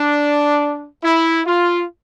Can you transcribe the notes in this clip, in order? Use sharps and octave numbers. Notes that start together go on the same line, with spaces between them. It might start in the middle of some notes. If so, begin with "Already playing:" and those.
Already playing: D4
E4
F4